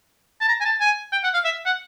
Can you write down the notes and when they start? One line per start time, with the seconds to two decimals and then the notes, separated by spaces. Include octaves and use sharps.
0.41 A5
0.48 A#5
0.60 G#5
0.65 A5
0.80 G#5
1.12 G5
1.23 F#5
1.34 F5
1.45 E5
1.66 F#5